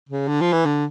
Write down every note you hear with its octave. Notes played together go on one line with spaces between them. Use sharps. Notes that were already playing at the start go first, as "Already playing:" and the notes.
C#3
D3
F3
E3
D3